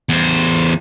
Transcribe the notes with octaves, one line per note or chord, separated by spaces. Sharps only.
E2 C5